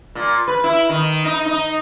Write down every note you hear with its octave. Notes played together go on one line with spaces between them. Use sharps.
A#2
B4
E4
D#3
D#4
D#4